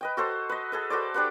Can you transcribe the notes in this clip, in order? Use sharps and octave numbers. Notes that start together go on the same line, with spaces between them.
B4 D#5 G5
F#4 A4 C5
B4 D#5
G#4 A4 B4
F#4 A4 C5 D5
D4 G4 B4 F#5